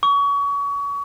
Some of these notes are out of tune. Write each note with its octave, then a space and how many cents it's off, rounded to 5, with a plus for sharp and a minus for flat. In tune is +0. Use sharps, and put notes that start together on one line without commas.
C#6 +30